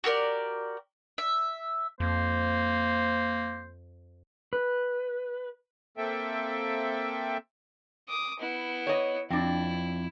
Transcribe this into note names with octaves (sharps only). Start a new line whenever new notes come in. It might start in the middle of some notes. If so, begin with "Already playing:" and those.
F#4 G4 A#4 D5
E5
F2 A#3 C5
B4
A#3 C4 A4 E5 G5
D6 D#6
B3 E4
C#5 D#5
F2 C4 D4 E4